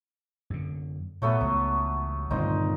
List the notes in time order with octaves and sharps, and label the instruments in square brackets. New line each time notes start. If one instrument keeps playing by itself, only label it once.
[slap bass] F#2 D3
[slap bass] A#2 [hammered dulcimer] F#3 A3 B3
[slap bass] C#2 E3 [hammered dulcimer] F#3
[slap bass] D#1 G2 D3 [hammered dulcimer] A#2 C4 D#4